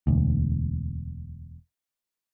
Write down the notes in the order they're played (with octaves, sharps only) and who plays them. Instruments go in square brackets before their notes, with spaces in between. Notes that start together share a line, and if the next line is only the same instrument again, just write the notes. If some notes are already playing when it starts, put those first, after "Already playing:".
[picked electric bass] E1 D2